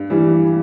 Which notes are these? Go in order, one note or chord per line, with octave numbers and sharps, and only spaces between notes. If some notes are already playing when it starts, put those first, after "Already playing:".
Already playing: G2
E3 G3